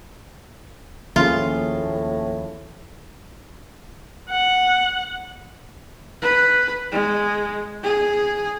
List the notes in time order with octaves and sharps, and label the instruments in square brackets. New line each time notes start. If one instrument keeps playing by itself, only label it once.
[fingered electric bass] D#2 F3 [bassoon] A2 [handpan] A#3 C#4 G#4 [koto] F4
[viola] F#5
[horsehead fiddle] B4
G#3
G#4